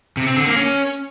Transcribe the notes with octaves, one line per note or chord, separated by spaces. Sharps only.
C3
C4
D3
A#3
C#4